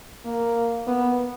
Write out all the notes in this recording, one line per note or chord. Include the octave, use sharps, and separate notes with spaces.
A#3
B3